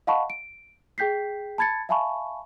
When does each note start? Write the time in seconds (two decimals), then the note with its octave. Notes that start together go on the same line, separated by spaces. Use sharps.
0.07 D#5 F5 F#5 A5 B5 C#6
0.30 D7
0.98 G#4 G5 G6 B6 C7
1.58 A5 B5 G#6 A6 C#7
1.89 E5 F5 G#5 A5 B5 C#6